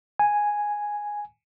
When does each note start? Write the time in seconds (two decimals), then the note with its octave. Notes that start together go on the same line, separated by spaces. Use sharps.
0.19 G#5